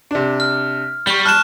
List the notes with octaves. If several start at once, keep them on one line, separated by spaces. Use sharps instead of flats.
C3 D4
F6
G3 C#6 G7
A5 F6 F#6 E7